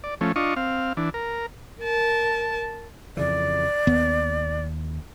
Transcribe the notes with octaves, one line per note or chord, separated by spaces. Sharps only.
D5
F3 A3 C#4
D4 F4 D#5 C#6
C4 F5
E3 D4
A#4
A#4 A5
F2 C#3 E3 D5
D#2 B3